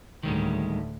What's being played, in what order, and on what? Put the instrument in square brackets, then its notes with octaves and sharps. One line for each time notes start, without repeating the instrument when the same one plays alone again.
[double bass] D2 A2 [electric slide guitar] D#3 G3 G#3